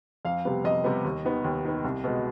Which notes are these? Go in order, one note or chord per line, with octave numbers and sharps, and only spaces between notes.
F2 F5
C3 G3 B3
F2 D#5
C3 G3 B3
D#2
D#3 B3
D#2
D#3 B3
C2
B2 G#3 B3